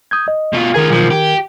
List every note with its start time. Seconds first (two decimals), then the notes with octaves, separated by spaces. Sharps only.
0.11 D#6 G6 G#6
0.28 D#5
0.53 B2 F4
0.74 D#3 F4 G#4 A#4 G#6
0.90 B1 F3
1.11 G4